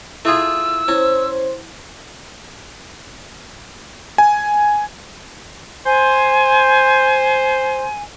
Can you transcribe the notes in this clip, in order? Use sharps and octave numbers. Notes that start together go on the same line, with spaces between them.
A3 E4 F4 G#4 D#6 E6
C#4 E4 C5
G#5
C5 G#5